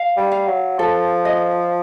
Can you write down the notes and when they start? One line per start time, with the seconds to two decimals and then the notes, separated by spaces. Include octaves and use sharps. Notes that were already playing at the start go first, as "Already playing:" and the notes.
Already playing: F5
0.17 G3
0.32 F5
0.48 F#3
0.79 F3 A4
1.25 D#5